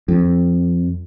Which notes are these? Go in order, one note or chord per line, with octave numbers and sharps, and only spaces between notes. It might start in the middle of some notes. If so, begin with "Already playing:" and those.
F2